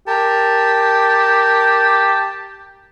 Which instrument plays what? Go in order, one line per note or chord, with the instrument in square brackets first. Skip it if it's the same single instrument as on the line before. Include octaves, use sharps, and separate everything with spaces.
[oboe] G4 [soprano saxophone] A#4 [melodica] A5